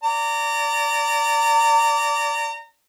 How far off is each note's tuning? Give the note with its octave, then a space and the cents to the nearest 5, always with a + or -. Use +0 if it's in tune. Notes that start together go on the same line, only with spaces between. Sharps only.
D5 -20 A#5 -30